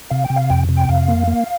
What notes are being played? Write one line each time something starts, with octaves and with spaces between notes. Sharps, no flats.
C3 F5
G5
C3
F5
F2 G5
C3
G5
F2 F5
A#3
A#3